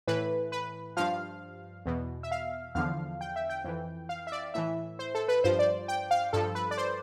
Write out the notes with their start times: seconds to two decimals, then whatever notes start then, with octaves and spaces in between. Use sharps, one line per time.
0.07 A2 E3 B4
0.52 B4
0.97 G2 F3 F5
1.86 E2 B2
2.23 E5
2.32 F5
2.75 E2 D3 F3 F5
3.21 G5
3.36 E5
3.50 G5
3.64 F2 E3
4.09 F5
4.27 E5
4.32 D5
4.54 A2 E3 E5
4.99 C5
5.15 A4
5.28 B4
5.44 G2 F3 C5
5.59 D5
5.88 G5
6.11 F5
6.33 G2 F3 A4
6.55 B4
6.71 D5
6.78 C5